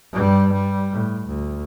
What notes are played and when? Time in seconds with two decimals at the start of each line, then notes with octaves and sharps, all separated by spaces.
0.13 G2 G3
0.53 G3
0.93 A2
1.28 D2